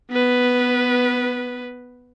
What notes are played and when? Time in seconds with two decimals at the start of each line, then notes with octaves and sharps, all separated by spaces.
0.11 B3 B4